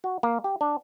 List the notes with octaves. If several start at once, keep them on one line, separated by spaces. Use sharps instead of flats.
F#4
A#3
G4
D4